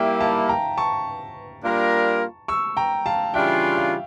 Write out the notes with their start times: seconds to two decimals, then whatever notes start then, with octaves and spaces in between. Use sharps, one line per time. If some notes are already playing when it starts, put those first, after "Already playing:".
Already playing: G3 A#3 E4 E5 G5
0.21 F5 A5
0.49 G5 A#5
0.78 A5 C#6
1.63 G3 A#3 D4 F4 A#4
2.48 C#6 E6
2.77 G5 A#5
3.06 F5 A5
3.34 C#3 E3 G3 D4 F4 E5 G5
3.77 F5